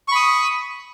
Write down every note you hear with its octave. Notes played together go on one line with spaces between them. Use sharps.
B5 C#6 D#6